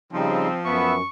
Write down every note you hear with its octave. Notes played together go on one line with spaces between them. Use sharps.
C#3 F3 G3 C4 D#4
F#2 B3 E5 C#6